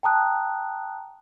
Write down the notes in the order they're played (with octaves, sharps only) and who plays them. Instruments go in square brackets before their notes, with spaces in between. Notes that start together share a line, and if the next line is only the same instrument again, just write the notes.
[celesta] G5 A5 A#5 D#6 F#6